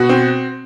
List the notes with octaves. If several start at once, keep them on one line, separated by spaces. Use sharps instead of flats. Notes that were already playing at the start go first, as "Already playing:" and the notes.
Already playing: B2 F#4 F#5
C4